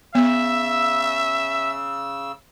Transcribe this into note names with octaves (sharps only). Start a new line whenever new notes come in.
C#3 B3 E5 E6